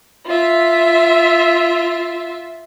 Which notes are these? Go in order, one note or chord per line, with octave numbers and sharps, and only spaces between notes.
F4 E5